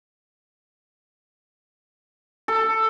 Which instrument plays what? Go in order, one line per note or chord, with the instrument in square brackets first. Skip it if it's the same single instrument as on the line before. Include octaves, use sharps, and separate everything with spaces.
[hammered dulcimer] A4